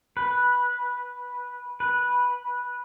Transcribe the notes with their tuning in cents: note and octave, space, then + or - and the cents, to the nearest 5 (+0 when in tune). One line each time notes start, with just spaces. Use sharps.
B4 -10
B4 -10